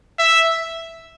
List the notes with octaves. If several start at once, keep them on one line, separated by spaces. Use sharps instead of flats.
E5